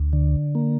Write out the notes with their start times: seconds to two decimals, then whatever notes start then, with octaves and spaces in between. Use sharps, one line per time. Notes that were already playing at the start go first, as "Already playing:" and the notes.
Already playing: D2
0.13 D3
0.55 A#3